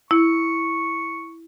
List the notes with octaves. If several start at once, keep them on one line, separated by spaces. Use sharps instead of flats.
E4 C#6